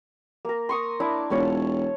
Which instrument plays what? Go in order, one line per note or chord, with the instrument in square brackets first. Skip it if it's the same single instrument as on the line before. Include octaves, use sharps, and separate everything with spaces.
[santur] A#3 A#4
C6 C#6 D#6
D4 E4 D6
[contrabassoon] E1 [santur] F4 C#5 A5